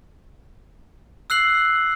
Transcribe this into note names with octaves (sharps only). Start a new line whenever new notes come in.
E6 F#6 C7 F#7